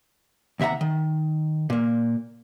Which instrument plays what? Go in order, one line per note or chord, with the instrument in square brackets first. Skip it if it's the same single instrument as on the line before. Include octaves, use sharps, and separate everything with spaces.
[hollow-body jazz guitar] D#2 C3 E5 F#5 A#5
D#3
A#2 A#3